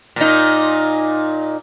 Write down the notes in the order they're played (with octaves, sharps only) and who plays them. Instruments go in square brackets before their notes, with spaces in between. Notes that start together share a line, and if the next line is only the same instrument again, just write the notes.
[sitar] A#2 D#4